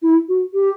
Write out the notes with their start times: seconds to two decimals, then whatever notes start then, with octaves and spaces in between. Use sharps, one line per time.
0.02 E4
0.29 F#4
0.54 G4